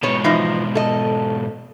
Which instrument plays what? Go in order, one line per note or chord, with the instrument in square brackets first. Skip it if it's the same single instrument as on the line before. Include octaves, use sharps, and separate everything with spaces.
[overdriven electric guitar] G#2 B2 [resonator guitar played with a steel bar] B3 C#5
[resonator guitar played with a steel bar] E3 F3 D#4
A4 D#5